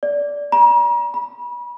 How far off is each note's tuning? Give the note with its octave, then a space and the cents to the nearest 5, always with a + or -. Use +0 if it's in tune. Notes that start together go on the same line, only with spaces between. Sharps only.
D5 -15
A#5 +40
B5 -35